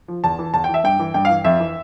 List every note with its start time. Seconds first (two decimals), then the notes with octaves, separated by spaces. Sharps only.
0.08 F3
0.24 E2 A5
0.39 E3
0.54 E2 A5
0.64 G5
0.69 E3
0.74 E5
0.84 G2 G5
0.99 E3
1.14 G2 G5
1.25 F5
1.29 E3
1.44 F2 E5
1.60 E3